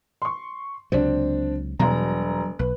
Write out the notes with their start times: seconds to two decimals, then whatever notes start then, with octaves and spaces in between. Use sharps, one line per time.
0.22 C6 C#6
0.92 C#2 C3 F#3 C4 D4
1.80 E1 B2 F#3 G3 A#5
2.59 B1 B4